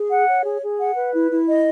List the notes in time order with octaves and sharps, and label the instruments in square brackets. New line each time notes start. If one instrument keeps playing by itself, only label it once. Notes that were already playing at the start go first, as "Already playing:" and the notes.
Already playing: [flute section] G#4
F#5
C#5
G#4
G#4
F#5
B4
E4
E4
D#5